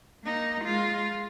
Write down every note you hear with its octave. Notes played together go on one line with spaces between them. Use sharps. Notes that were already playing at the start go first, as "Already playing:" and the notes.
A#3 D#4
G#3 F4